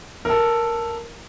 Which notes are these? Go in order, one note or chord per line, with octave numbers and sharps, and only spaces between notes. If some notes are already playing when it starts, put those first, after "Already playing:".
A4 A#4